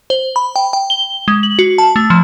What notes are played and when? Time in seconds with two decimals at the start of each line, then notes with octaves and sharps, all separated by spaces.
0.10 C5
0.36 B5
0.56 G5
0.73 G5
0.90 G7
1.28 G#3
1.43 F#7
1.59 F#4
1.78 A5
1.96 A3
2.10 F3